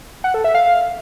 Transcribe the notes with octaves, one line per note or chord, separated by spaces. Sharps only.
F#5
A4
E5
F5